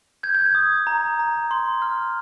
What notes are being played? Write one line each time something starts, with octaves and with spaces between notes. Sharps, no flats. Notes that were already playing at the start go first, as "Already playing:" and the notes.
G6 G#6
G6
G#6
D#6
A#5
A#5
C6
F6